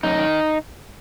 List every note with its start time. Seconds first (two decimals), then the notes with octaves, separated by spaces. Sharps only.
0.03 F#2 D#4
0.19 D#3